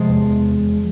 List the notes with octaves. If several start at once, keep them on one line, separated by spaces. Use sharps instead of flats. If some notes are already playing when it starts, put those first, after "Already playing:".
Already playing: C3 F3 G#3
E2